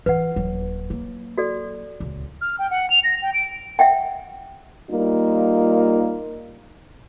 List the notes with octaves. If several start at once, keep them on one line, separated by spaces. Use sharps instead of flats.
E3 F4 B4 F#5
D#1 F#3
F#3 A#3
F#4 A4 D5
D#1 C#2
F6
G5
F#5
F7
A#6
G5
D7
E5 F#5 G5
G3 A#3 D#4 F4